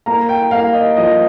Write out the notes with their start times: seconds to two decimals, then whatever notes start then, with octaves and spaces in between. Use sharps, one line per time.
0.06 A#3 A#5
0.29 G5
0.51 A#3 F5
0.74 D#5
0.96 F3 D#5